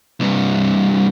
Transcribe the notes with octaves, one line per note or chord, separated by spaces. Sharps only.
C2 G2